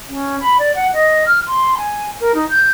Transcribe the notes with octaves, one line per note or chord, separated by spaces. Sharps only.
C#4
B5
D5
F#5
D#5
F6
C6
G#5
A#4
D#4
G6